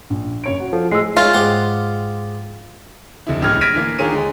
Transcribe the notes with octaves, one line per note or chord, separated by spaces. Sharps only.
A#1
F#1 C#5 D7
F#4
F3 A4
A2 G#3 E6 C7
G#3 C#4 F4 E5
G#2 G4 F#5
F1 C3 E4
E1 C#2 A2 G4 F6 G#6
F6 G#6 A#6 B6 D7 D#7
D3 E3 A#3
D#2 F4 G#4 A#4 C#5 D#7
D3 G#3